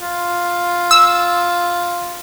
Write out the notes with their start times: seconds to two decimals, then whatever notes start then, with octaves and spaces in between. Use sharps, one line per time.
0.01 F4
0.91 E6